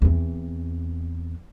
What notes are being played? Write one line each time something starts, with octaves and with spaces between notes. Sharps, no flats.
E2 C4